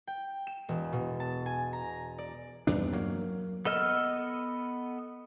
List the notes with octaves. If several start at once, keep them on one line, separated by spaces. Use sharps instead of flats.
G5
E7
E1
B2
A5
G#5
A#5
D5
E2 G2 D4
F#3 A#3
B3 A4 D#5 E6 F6